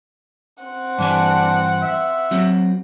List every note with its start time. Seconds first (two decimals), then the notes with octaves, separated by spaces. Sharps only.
0.64 C4 F#5
0.98 G2 E3 D4 G#5
1.82 E5
2.31 F#3 C4 F#4